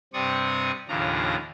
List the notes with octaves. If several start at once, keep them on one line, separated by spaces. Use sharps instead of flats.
G2 C3 C4 D5 C#6 D#6
D#2 A2 C#3 F3 D4 A#5